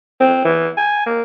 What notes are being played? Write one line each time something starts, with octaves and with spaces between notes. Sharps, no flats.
C4
E3
G#5
A#3